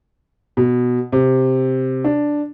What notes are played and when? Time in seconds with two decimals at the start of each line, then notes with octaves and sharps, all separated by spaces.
0.57 B2
1.12 C3
2.04 D4